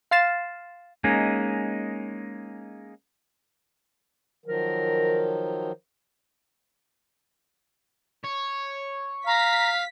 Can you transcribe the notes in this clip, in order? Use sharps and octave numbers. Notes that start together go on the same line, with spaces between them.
F5 C6 F6 A6 C7 E7
G#3 A#3 C#4 D#4
D#3 F3 F#3 A#4
C#5
F5 A#5 B6